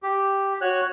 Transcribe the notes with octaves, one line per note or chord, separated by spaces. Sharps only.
G4
F#4 C#5 F#6